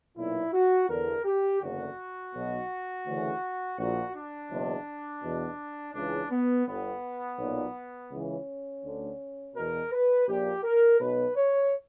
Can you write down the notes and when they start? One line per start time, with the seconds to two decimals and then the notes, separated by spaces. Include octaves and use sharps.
0.17 B1 A#2 E4
0.53 F#4
0.89 E2 D3 A#4
1.25 G4
1.61 F#1 E2 D3 F#4
2.33 B1 B2
3.06 D2 C#3 E3
3.78 A#1 A#2 F#4
4.14 D4
4.50 F#1 E2 B2
5.22 E2 B2
5.94 C#2 C#3 E3 D4
6.30 B3
6.67 G1 G2 D3 B3
7.38 B1 A#2
8.11 C#2 C#3 E3 C#4
8.84 D2 D3
9.55 E2 B2 A#4
9.92 B4
10.27 A#1 A#2 G4
10.64 A#4
10.99 B1 B2 B4
11.36 C#5